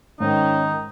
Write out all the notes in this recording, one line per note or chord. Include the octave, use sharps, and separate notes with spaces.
G#2 D#3 C#4 D#4